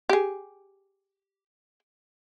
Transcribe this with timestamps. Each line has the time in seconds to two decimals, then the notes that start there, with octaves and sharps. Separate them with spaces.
0.09 G4 G#4